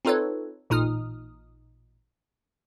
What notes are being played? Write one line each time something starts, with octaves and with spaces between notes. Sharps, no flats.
C4 D#4 F4 A4 B4 C#5
A1 A#2 D#4 D#6 F6